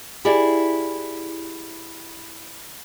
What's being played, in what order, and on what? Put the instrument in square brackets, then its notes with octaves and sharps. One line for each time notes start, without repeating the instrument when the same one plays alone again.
[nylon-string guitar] E4 G4 G#4 D5 E5